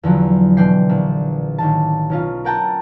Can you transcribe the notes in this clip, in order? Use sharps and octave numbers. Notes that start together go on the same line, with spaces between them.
E2 D3 F3 F#3
B2 D3 E3 D5 G5 C7
A#1
A1 D#3 A5
B1 C#4 F4
A#4 F#5 G5 A5 A#5